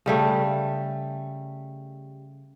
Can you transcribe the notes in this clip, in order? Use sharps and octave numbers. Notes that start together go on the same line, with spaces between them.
C#3 G3 A3